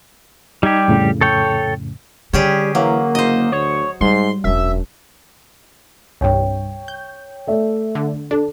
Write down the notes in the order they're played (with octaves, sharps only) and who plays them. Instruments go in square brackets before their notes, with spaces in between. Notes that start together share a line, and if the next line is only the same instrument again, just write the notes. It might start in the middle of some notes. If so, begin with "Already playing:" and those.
[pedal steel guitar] G3 G4 [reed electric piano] D#4 G#6
[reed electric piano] F2 A2 C#3
[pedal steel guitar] A4 C#5 G5
[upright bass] D3 [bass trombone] G3 [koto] C#4 G4 G#4
[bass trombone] E3 [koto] F#3 [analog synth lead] A#3
[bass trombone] F#1 [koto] C5 D#5
[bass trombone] D2 [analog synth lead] C#5
[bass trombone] G#2 [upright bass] G3 [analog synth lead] C6
[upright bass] E1 D4 [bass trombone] F#2 [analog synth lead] E5
[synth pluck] C2 G2 [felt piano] C#5 G5
[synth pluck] G6
[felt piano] A3 D5 E5
[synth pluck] D3
[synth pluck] D4 [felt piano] A4